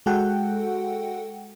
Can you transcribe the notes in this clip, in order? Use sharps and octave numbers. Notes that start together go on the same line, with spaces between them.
G#3 F#4 A4 F#5 G5